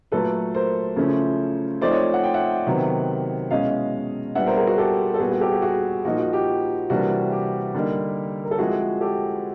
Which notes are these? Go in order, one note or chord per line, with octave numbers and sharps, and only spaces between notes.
A#2 F#3 A3 A4 B4
A#4 C5
C#3 F3 A3 C#4 E4
F3 A3 C4 D#4 C5 D5
C#5 D#5
F#5
G5
E5 F#5
C3 D#3 F#3 B3
B2 G#3 C#4 E4 D#5 F5
A#2 G3 B3 D4 E5 F#5
A#4 C5
G#4 A#4
F#4 G#4
G4 A4
A4
A#2 G3 B3 F#4 G#4
F#4 G#4
G4 A4
F#4 G#4
F#4 G#4
A#2 F3 A#3 D#4 F#4
F#4
G4
C3 E3 G3 A#3 D4 F#4
G4
D3 G3 A#3 D#4
A#4
A4
F3 G#3 C4 E4 F#4 G#4
G4 A4